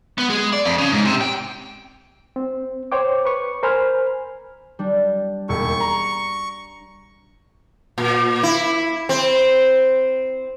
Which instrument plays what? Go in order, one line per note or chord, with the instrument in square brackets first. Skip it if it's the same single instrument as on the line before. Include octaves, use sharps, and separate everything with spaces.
[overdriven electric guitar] B3
G#3
D5
F2
C#3
G#2
C3
G5
[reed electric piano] C4
C5 C#5 G5 D6
B4 C#6
A#4 C5 G#5 B5 F6
[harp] G3 D4
[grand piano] E1 D#2 [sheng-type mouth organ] C#6
[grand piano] A#5
[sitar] A#2
E4
C4